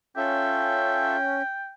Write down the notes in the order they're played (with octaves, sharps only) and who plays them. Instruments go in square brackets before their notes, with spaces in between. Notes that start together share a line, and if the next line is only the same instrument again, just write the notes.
[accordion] C#4 [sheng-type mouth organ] F4 A4 E5 [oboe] G5